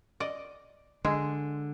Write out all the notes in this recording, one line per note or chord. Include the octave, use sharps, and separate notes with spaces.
D5 D#5
D3 G#3